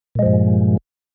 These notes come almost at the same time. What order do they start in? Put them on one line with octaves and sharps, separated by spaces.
A#2 G#3 F3 G2